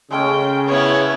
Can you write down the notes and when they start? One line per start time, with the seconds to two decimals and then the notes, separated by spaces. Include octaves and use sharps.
0.11 C#3 G#3 A3 C#4 G5
0.67 B3 E4 C#5